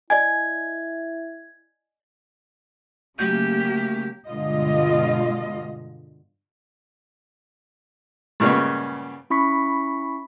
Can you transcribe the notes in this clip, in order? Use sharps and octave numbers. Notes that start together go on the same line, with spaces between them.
E4 D5 D#5 G#5 G#6
C#3 F#3 A3 A#3 G4 G6
G2 B2 D3 G#3 F4 D#5
G2 A#2 C#3 G#3 B3 C#4
C#4 E4 B5 C#6 B6